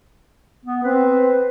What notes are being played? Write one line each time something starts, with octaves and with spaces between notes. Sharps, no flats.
B3
C4 B4